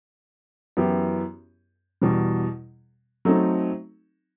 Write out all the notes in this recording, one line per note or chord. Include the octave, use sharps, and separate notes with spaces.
F#2 E3 B3 E4 G4
E2 B2 G3
F#3 A3 C4 D#4 A4